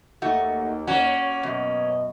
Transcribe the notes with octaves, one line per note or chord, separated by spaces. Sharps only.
D#2 A3 D#4 F#4
A#3 C#4 F#4
F#2 B2 D#5